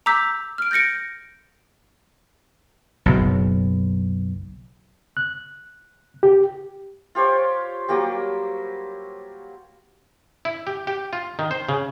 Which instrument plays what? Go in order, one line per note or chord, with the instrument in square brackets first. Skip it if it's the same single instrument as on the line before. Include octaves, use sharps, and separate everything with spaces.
[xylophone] A#5 D6 E6 G6 B6
F6 D7
G6 A6 A#6 C#7 D7
[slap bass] F#1 B1
[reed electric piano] F#6
G4
[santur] F4 G4 C5 C#5
F#3 G3 A#3 G4
[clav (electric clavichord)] E4
G4
G4
F4
D#3
C5
C#3